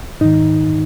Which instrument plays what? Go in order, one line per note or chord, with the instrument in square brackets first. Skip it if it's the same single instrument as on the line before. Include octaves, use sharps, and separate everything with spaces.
[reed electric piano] G#2 D#3 D#4